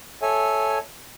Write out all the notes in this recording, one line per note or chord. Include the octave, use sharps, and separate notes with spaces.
A4 C#5 E5 G#5